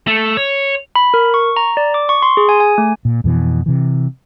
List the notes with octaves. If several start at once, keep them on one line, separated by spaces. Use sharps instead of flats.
A3
C#5
B5
A#4
C#6
A#5
D5
D6
C#6
C6
G#4
G#5
G#5
A3
A#2
F2 B2 E3
C3 E3